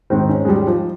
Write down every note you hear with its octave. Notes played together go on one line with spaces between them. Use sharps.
G#2 D#3 C4
C#4
G#3
G3
F3